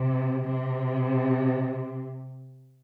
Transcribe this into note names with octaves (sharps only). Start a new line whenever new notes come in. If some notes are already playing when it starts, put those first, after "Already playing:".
Already playing: C3
C3